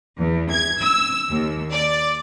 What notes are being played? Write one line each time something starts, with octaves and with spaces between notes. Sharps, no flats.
E2
G#6
E6
D#2
D5